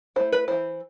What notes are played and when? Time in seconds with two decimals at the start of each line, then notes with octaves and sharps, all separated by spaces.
0.16 A3 E4 C5
0.32 B4
0.48 E3 A3 E4 C5